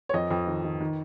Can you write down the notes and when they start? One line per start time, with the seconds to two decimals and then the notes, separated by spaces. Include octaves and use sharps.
0.09 C#5
0.14 F2 D#5
0.31 F2
0.47 D#3
0.64 D#3
0.80 D#3